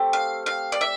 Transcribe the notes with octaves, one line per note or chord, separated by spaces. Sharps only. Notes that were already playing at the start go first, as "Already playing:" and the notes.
Already playing: A3 C4 G4
F5
F5
D5
E5